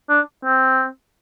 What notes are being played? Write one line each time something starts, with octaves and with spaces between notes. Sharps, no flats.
D4
C4